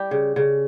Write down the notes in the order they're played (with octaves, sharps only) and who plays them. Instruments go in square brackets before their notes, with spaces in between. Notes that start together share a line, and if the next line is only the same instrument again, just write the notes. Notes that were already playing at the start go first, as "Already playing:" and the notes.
Already playing: [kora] G3 G4
C#3
C#3